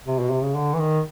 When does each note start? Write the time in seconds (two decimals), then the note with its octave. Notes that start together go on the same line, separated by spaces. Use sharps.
0.07 C3
0.20 B2
0.32 C3
0.43 C#3
0.55 D3
0.74 E3
0.79 D#3